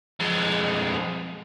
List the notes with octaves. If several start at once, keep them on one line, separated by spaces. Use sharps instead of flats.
F2 G#3